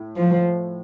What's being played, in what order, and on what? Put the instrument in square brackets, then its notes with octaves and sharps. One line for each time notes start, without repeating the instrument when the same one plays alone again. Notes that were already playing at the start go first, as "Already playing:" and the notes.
Already playing: [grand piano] A2
[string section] F3